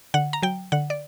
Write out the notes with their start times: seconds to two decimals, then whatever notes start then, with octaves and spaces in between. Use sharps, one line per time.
0.14 D3 F#5
0.33 A#5
0.43 F#3 G5
0.72 D3 F#5
0.90 D5